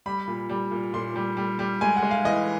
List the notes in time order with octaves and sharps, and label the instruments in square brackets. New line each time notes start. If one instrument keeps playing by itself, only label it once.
[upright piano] G3 B5
A#2
G3
A#2
A#2 C6
G3
G3
G3
G#3 G#5
F#5
G#3
F5
E3 D#5